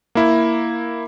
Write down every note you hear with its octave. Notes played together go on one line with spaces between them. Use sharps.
A#3 E4